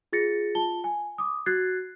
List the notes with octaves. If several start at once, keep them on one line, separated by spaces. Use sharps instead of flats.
F4 G#4 A6 A#6 C#7
F4 A5 G7
G#5
D6 D#6
F#4 F#6 G#6 A6 C7